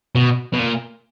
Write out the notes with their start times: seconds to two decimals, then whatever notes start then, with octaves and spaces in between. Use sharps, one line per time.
0.15 B2
0.53 B2
0.59 A#2